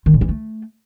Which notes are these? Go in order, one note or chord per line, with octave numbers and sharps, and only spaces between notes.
D#3
A#2
E3
A3